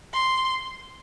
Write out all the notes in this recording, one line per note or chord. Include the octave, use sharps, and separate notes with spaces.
C6